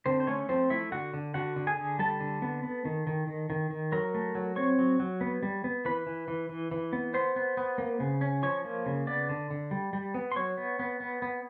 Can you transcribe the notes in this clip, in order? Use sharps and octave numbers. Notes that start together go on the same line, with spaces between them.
D3 C4 C5
C5
A3 C#4 C#5
F3 C4 C5
A3 E4 E5
D3 F#4 F#5
D3
D3 F#4 F#5
D3
G#4 G#5
D3
G3 A4 A5
D3
B3
B3
D#3
D#3
D#3
D#3
D#3
F#3 A#4 A#5
A3
F#3
C4 C#5 C#6
F#3
F#3
B3
G3
B3
E3 B4 B5
E3
E3
E3
E3
B3
B3 C5 C6
B3
B3
A#3
C#3
C#4
F3 C#5 C#6
A#3
C#3
B3 D5 D6
D3
D3
G3
G3
B3
C6
F#3 C#5 C#6
B3
B3
B3
B3